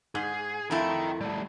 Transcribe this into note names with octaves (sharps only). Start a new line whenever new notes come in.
G#2 G#4
F2 A3 E4 A#4 G5
G3 A3